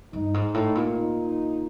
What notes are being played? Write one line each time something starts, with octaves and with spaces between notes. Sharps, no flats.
G2 D#4
G#2
A2
A#2
D#4